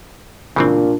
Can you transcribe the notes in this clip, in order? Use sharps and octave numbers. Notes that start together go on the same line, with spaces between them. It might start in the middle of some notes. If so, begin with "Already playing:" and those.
A#2 C#3 E3 C4 D4